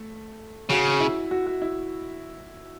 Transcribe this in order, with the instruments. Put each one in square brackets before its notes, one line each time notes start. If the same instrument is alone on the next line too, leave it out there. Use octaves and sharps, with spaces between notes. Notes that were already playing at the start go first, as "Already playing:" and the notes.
Already playing: [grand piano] A3 A4
[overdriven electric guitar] C#3 [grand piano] F#4
[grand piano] E4
F#4
F#4
E4